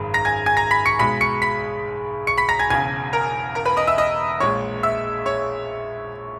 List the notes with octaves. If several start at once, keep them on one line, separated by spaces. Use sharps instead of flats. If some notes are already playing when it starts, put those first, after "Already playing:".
Already playing: G#1 F#2 C#3 G#3 B5
A#5 A#6
G#5 G#6
G#5 G#6
A#5 A#6
B5 B6
C#6 C#7
B1 B2 G#3 B5 B6
C#6 C#7
B5 B6
C#6 C#7
B5 B6
A#5 A#6
G#5 G#6
E1 E2 C#3 G#5 G#6
A#4 A#5
A#4 A#5
B4 B5
D#5 D#6
E5 E6
D#5 D#6
A#1 A#2 G#3 C#5 C#6
E5 E6
C#5 C#6